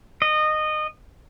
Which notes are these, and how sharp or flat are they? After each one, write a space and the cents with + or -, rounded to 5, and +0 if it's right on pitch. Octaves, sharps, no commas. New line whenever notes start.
D#5 -20